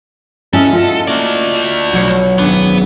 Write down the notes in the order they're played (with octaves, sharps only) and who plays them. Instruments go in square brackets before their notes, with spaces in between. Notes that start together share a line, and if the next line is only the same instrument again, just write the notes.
[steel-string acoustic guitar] C#4 E4 D#5 [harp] F#4 E5 F6 [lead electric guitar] A4
[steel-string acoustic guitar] F4 D#5
[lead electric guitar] A3 D5 [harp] A#3
[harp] B1 F#3 C#5
[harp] G#1 C#4 D4 [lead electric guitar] B3